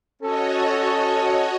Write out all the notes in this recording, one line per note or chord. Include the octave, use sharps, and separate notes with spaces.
C#4 F#4 A4 C#5 D#5